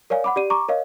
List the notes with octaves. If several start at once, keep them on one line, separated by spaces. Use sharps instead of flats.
A#4 C#5 D5 F5 G#5
F#5 B5 D6
G4 D5 D#7
A#5 C#6 D6
A#4 C#5 D#5 F5